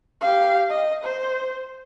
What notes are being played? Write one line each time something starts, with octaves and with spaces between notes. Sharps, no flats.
G4 F5
D#5
C5